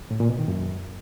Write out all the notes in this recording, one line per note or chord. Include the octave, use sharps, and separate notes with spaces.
A2
A#2
B2
D#3
F#2